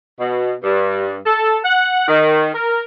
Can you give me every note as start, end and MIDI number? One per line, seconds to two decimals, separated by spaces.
0.19 0.53 47
0.63 1.17 43
1.26 1.58 69
1.63 2.07 78
2.08 2.50 51
2.54 2.84 70